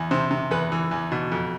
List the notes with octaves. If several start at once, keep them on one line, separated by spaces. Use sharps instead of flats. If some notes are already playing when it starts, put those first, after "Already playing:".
Already playing: E2
C3 C5
C3
E2 B4
E3
E2
B2
F2